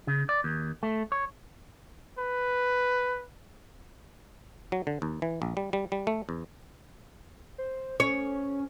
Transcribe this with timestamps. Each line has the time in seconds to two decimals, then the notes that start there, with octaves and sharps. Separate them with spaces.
0.07 C#3
0.29 D5
0.44 D#2
0.83 A3
1.12 C#5
2.18 B4
4.72 F#3
4.87 D3
5.02 D#2
5.22 E3
5.42 A#1
5.57 G3
5.73 G3
5.92 G3
6.07 A3
6.29 E2
7.58 C5
8.00 C#4 C#5